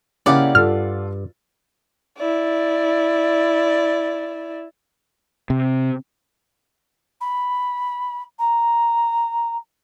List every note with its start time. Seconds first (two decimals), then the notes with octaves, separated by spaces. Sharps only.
0.26 C#3 A#3 C#4 E4 G4 D5 F5 F#5
0.55 G2 F4 A4 F6
2.18 E4 D5
5.50 C3
7.21 B5
8.39 A#5